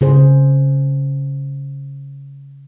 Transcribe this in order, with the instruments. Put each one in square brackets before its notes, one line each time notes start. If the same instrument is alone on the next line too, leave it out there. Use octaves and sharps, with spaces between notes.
[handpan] C#3 G#4 C5